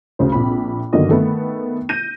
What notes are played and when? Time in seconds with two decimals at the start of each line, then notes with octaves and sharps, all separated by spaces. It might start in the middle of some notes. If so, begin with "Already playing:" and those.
0.19 D2 C#3 C5
0.32 A#1 C4 B5
0.93 G1 D3 D#3 F#3 A#3 D#5
1.09 D#3 A3 B3
1.89 G6 A#6 D#7